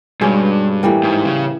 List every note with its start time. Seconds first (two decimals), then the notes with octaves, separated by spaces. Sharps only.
0.21 G2 B2 G#3 C#4
0.83 A2 E3 G3 A#3
1.04 G#2
1.25 C#3